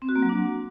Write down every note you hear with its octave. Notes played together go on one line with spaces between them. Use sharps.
C4
F#4
A#3
F#3
D4